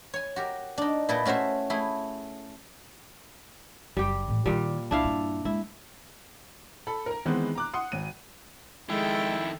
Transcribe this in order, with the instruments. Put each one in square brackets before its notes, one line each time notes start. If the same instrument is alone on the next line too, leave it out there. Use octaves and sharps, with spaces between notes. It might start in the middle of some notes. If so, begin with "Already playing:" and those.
[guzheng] C#5 G#5
F#4 G4 A#4
D4 D#4
A#2 E4 A4 B4 D#5 G5
A3 C#4 F#4 C5 E5
A3 E4 G#4
[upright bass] F#1 D4 [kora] G3 G4
[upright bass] A2 E3
[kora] A#2 G3 [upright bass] D#3 E4
[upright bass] C2 [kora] D4 E4 F5
[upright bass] G2
[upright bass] G#3 [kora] E4
[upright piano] A4 B5
A#4 A#5
D#3 E3 G#3 B3 C4
A#5 D6 F#6
F#5 C6 D#6
G#1 D#7
[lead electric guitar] F2 D#3 [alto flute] G#3 [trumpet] E4 [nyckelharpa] A4 G5